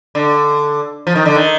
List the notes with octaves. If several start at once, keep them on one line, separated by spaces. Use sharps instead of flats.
D3
F3
D#3
D3
D#3